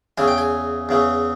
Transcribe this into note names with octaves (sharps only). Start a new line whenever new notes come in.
E2 C#3 E3 G#5
G5
G#5
E2 C#3 E3